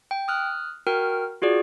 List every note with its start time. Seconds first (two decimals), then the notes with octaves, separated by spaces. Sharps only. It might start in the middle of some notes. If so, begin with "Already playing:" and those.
0.11 G5
0.28 D#6 F6 F#6
0.87 F#4 A#4 G5 F6
1.42 F4 F#4 G#4 D5